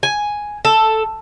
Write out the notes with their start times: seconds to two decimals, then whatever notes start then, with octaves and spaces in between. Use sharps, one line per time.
0.03 G#5
0.65 A4